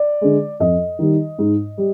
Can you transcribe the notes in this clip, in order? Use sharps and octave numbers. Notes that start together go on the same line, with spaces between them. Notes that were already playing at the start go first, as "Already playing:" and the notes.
Already playing: D5
D3 G#3
F2 D#5
D#3 G3
G#2
G3